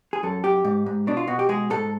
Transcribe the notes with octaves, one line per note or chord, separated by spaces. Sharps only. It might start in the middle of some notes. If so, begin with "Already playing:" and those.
G#4
F#2 A4
F#2 G4
G#2
G#2
B2 D4
F4
B2 F#4
G4
G#3 G#4
G#2 A4